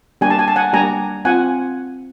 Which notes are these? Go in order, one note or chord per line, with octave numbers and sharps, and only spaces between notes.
G3 A#3 D4 G4 G#5
A5
G#5
A5
F#5 G#5
G3 A#3 D4 G4 G#5 A#5
C4 F4 F#5 G#5